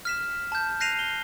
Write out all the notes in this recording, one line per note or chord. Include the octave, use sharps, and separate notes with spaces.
F6 B6 E7
A5 G6
F#6 A#6 C7 D#7 F7
G7